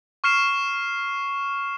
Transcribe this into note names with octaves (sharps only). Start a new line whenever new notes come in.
C#6 F6 C7 E7